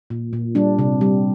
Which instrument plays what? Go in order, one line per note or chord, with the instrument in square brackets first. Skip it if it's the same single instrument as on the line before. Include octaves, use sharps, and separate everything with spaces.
[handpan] A#2
A#2
G3 D4
C3
G3